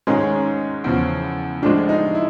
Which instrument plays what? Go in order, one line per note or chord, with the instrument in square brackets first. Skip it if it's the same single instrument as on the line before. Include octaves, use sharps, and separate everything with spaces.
[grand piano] G#2 D#3 G#3 [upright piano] C#4
[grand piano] E2 C#3 F3
[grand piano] A2 F3 G#3 [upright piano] D4
[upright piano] D#4
E4